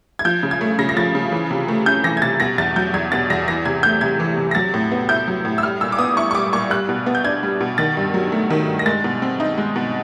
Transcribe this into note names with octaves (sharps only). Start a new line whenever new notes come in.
G#6
F3 G6
C#3
G#6
A3
C#3 A#6
A#6
F3 A6
C#3
E3
C3
A3
C#4 G6
E3 A#6
G#6
C3 A6
B2 A#6
E2 A6
F#3 G6
E2 G#6
B2 A6
E2 A#6
E3 A#6
C3 G#6
A3 G6
C3 G#6
E3
C3
A#6
F#3 A6
A2
B3
E4 G6
F#3
A2
E6
G3 F6
A#2 E6
D6
B3 D#6
E4 C#6
C#6
G3 D6
A#2 C#6
G3 F#6
B2
B3
G6
D4 G#6
G3
B2
D#3 A6
G2
F#3
A3
D#3
G2
A#6
G#3 A6
B2
C4
D#4
G#3
B2